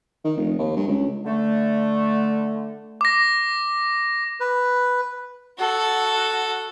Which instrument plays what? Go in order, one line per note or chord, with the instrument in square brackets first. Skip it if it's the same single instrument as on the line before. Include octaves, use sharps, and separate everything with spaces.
[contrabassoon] D#3
F1
D#2
G2
C#2
[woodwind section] D3 A3
[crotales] D6 A#6
[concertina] B4
[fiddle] F#4 A4